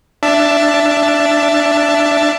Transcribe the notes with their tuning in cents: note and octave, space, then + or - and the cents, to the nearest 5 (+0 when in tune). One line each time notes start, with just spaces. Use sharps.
D4 +0 E5 +20 A5 +0